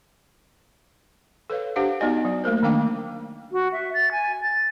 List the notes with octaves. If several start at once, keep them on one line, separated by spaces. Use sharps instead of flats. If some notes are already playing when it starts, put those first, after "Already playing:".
A4 B4 C#5 F5
D4 G4 C5 F5 F#5
B3 D#4 F#4 D5 D#5 G#5
F#3
A3 A#3 A#4 C5
D#3 A#3 D4 F5 G5 D6
F#4
E5
A6
G#5
A6